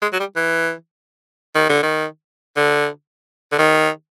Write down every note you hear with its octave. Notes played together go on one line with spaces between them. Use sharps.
G#3
F#3
G3
E3
D#3
D3
D#3
D3
D3
D#3